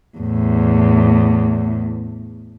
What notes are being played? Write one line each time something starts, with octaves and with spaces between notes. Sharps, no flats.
E2 A2